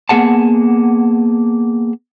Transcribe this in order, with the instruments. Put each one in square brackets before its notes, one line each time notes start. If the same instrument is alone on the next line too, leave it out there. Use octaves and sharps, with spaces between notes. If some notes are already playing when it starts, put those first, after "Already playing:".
[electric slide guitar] A#3 B3 G#4 F#5 A5